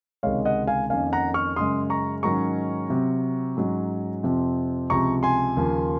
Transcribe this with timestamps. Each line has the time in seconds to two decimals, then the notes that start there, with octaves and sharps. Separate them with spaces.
0.23 C#2 C3 D#3 G#3 C#5 F5
0.45 D#5 F#5
0.67 F5 G#5
0.90 F2 D#3 A#3 C#4 F5 G#5
1.13 F#5 A#5
1.34 C#6 F6
1.56 F#2 C#3 G#3 C6 D#6
1.90 A#5 C#6
2.23 G#2 D#3 F#3 C#4 A#5 C#6
2.90 C3 F#3 C4
3.57 G#2 F#3 C#4
4.23 F2 C3 F3 C4
4.90 C#2 C3 F3 A#5 C#6
5.23 G#5 C6
5.57 D#2 C#3 F3 A#3